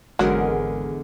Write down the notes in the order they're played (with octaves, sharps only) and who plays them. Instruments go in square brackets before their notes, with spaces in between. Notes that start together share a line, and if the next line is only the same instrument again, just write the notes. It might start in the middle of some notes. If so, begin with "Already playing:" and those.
[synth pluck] G#1 G#3 A#4 [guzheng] E2 D3 G#4 [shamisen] F#3